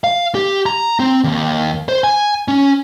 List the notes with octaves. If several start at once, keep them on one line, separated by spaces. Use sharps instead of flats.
F5
G4
A#5
C4
D#2
C5
G#5
C#4